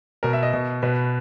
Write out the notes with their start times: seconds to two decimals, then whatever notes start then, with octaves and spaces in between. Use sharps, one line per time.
0.23 B2 A#4
0.33 E5
0.43 D#5
0.53 B2
0.83 B2 B4